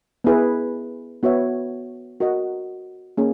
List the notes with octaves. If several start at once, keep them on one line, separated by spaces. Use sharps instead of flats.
B3 E4 G#4 B4
B3 F#4 C#5 E5
F#4 A#4 D#5 F#5
A#3 C#4 G#4